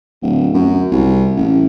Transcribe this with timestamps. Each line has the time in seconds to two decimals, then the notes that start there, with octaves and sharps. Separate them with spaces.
0.22 D1
0.54 F#2
0.92 C2
1.36 A1